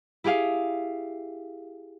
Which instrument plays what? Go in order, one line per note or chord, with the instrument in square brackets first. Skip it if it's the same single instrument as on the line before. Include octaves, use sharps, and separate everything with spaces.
[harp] E4 G4 G#4 F5